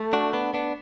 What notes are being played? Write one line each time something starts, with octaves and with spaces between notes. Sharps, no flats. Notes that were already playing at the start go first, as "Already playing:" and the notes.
Already playing: A3
D4 F#4
B3 D4
B3 D4